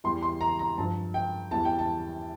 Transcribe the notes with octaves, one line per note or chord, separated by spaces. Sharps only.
E2 E3 G3 C6
C6
A#5
A#5
G2 F3 A5
G5
E2 E3 G3 A5
G5
A5